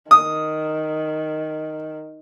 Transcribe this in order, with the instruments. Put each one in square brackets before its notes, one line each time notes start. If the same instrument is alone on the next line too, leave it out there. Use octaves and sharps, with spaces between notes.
[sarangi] D#3 [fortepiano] D#6